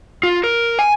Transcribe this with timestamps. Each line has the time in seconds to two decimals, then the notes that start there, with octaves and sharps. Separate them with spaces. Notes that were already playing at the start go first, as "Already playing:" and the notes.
0.23 F4
0.44 A#4
0.79 G#5